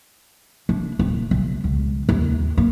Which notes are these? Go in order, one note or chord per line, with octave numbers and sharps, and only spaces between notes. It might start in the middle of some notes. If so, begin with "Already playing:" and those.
D4
D#1
B1
C#2
D#2
A#3